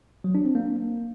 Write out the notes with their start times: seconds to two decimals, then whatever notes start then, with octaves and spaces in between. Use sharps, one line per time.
0.24 F#3
0.35 D4
0.45 C4
0.55 A#3